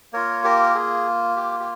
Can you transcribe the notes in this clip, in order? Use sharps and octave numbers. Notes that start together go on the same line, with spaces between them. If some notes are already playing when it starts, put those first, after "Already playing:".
A#3 F4 A#4 C#5
G4 A#4
G#4
G4
G4